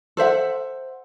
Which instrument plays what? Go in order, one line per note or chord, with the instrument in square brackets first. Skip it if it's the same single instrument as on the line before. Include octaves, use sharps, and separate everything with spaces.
[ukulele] A4 C5 E5 F#5